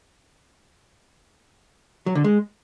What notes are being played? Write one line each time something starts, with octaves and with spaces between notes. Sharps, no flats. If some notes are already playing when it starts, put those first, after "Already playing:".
F#3
D3
G#3